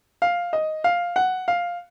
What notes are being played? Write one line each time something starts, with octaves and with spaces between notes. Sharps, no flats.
F5
D#5
F5
F#5
F5